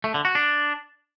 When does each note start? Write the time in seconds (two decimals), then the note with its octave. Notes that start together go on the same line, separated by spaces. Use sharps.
0.04 A3
0.14 D3
0.25 F#4
0.35 D4